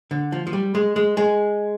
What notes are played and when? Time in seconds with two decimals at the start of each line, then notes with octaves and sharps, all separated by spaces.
0.11 D3
0.32 F3
0.47 F3
0.53 G3
0.75 G#3
0.96 G#3
1.17 G#3